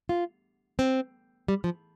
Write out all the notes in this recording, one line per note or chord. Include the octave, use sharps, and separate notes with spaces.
F4
C4
G3
F3